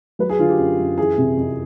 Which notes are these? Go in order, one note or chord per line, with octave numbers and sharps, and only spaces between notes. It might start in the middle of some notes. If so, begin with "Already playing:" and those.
F#3 B4
G#4
D3 F4
G4
F#2
F#2
E3 G#4
C3
F2